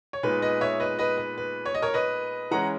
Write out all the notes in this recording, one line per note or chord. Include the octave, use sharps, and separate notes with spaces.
C#5
A#2 G#3 B3 D#4 B4
B4 D#5
C#5 E5
B4 D#5
B4 D#5
B4
B4
C#5
D#5
A#4 C#5
B4 D#5
E3 G#3 C#4 F#5 A#5